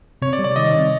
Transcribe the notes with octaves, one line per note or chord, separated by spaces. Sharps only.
C3 C#5
D5
G3
D5
D#3 D#5
C3